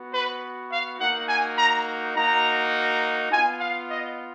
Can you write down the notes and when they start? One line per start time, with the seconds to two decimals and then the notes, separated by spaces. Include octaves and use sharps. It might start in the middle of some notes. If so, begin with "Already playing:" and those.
Already playing: B3 F#4
0.13 B4
0.71 F5
0.99 A#3 D#4 F#4 F#5
1.28 G#5
1.57 A#5
2.15 A#3 D#4 F#4 A#5
3.31 F4 G#5
3.36 B3
3.60 F5
3.89 D#5